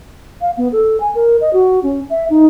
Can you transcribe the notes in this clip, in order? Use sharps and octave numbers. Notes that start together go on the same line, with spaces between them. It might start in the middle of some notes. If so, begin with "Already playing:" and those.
F5
B3
A4
G#5
A#4
D#5
F#4
C#4
E5
D#4